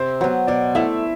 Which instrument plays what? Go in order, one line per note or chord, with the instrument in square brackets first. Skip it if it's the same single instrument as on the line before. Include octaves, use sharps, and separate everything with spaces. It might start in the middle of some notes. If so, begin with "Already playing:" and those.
Already playing: [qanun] C3 [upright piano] C5
[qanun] F#3 B3 [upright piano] C5
[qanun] B2 [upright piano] D5
[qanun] A3 E4 [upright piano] E5